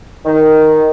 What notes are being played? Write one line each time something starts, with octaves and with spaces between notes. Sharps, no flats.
D#3